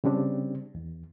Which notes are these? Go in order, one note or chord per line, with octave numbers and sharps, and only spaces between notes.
C#3 G3 C4 D4
E2